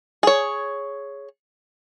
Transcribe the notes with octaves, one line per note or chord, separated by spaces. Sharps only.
G#4 C#5